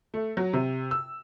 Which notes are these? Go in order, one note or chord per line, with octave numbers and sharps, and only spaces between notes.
A3
F#3
C3
E6